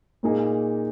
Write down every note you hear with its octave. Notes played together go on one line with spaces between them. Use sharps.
A#2 A#3 D#4 G#4